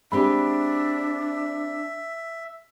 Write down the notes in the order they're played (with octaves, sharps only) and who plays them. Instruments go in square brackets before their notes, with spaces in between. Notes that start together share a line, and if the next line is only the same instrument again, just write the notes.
[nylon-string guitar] G#3 C4 G4 [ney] D4 [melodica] E5 [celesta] B5